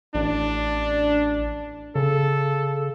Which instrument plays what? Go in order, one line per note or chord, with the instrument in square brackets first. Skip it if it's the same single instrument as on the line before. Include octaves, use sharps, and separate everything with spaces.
[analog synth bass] A1 [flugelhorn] D4
[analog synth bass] C#3 [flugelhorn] A4